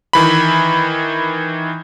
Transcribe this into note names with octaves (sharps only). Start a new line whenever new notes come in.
D#3 E3 B5